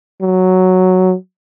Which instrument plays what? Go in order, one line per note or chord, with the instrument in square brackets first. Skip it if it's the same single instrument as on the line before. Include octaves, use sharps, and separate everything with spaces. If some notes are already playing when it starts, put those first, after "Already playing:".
[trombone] F#3